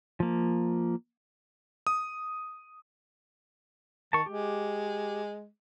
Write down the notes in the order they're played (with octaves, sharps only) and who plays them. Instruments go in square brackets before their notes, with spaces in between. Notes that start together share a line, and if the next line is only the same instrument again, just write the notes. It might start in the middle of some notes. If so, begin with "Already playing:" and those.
[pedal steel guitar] F3 A#3
[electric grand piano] D#6
[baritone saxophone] D#3 [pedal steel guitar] A5 C#6
[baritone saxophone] G#3 [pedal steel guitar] G4